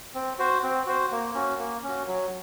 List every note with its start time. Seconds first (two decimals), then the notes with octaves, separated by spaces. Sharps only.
0.14 C4
0.39 F#4 C5
0.63 C4
0.87 F#4 C5
1.11 A#3
1.35 C#4 F#4
1.59 A#3
1.84 C#4 F#4
2.07 F#3